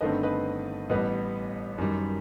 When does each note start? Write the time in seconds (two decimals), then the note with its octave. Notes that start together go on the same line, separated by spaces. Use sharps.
0.01 G1 G2 D#3 A3 C4 B4 D#5
0.23 B4 D#5
0.89 A1 A2 G3 B3 B4 D#5
1.78 F#2 D#3 G3